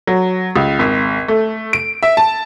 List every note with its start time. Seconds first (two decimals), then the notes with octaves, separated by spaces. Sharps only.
0.07 F#3
0.56 C#2
0.79 G#1
1.28 A3
1.73 D7
2.03 E5
2.17 A5